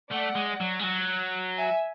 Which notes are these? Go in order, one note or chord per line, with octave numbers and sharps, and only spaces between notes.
A3 D5 F#5
G#3
F#3
G#3
F#3
E5 G#5